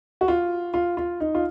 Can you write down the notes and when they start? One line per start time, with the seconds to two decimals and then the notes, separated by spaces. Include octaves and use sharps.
0.21 F#4
0.28 F4
0.74 F4
0.97 F4
1.20 D#4
1.35 F4